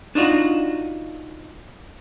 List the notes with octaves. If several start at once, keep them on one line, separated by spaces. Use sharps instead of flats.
D4 D#4 F4 F#4